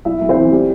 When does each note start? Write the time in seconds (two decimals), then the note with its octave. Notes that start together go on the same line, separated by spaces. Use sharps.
0.05 B1 E4 E5
0.21 B1
0.29 C4 C5
0.37 E3
0.52 G3 G4